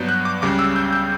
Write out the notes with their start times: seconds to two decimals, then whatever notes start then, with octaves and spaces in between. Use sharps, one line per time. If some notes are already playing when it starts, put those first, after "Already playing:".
Already playing: G2 F#3 B3 D4 G6
0.09 F#6
0.25 D6
0.42 C#2 C#3 G3 C#4 D6
0.59 E6
0.76 G6
0.93 G6